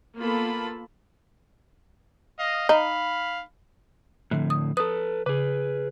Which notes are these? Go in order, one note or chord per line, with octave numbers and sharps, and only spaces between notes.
A#3 B3 F4 A4 A5 B5
D#5 F5
D#4 F5 B5
A2 D3 F3 C4
D#6
A4 B4 D#6
C#3 G#4 B4